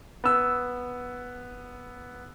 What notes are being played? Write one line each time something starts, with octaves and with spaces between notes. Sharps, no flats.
B3 E6